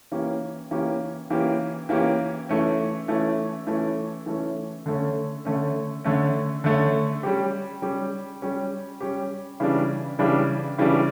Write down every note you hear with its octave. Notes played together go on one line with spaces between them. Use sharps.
E3 A#3 C#4 G4
E3 A#3 C#4 G4
E3 A#3 C#4 G4
E3 A#3 C#4 G4
E3 A3 C#4
E3 A3 C#4
E3 A3 C#4
E3 A3 C#4
D3 A3 C#4
D3 A3 C#4
D3 A3 C#4
D3 A3 C#4
G3 C#4 G4
G3 C#4 G4
G3 C#4 G4
G3 C#4 G4
C#3 E3 G3 D4
C#3 E3 G3 D4
C#3 E3 G3 D4